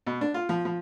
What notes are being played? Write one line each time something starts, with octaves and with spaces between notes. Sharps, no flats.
B2
D4
F4
F3
F3